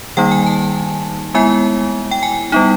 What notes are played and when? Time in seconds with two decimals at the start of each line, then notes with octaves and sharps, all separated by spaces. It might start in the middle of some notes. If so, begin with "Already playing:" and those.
0.17 D#3 G3 A#3 D#4 G5
0.31 G#5
0.46 A5
1.34 G#3 B3 E4 G#5
2.11 G5
2.23 G#5
2.52 G3 B3 D#4